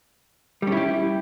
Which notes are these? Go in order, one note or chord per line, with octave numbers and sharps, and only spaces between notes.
G3 C#4 E4 G4